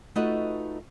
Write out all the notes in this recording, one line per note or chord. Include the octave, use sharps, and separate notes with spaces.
A3 D#4 F4 F#4 B4 D#5